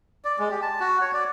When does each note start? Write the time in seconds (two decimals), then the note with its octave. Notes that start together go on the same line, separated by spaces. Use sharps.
0.25 D5
0.39 G#3
0.51 G4
0.62 A5
0.80 F#4
1.01 C#5
1.14 D5